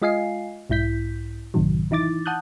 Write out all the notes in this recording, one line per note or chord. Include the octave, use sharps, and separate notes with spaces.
G#3 F4 D#5 F5 G#5 C7
B1 G#2 E4 G6 B6
A1 F#2 A2 C3 D#3 F#3
E3 D#4 E4 D6 A6
F#5 A5 D#6 F#6 G6